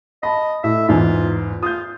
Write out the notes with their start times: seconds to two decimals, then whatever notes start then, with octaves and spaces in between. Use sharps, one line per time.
0.23 D#5 A5 B5
0.64 A2 E5
0.89 E2 G#2 F4
1.63 F4 D#6 G6